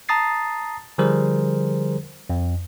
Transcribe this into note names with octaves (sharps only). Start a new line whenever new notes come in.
A5 A#5 D#6 A6 C7
D3 F3 G3 G#4 A#4 C5
F2